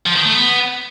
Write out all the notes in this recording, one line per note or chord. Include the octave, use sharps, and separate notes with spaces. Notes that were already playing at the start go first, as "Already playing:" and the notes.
F3
D#3
A3
B3